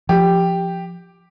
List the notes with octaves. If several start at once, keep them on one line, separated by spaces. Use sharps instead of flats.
F3 G4